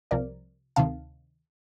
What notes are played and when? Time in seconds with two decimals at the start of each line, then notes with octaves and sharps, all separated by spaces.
0.11 C2 C3 F3 A#4 D5
0.76 D2 C3 D#3 F5 A5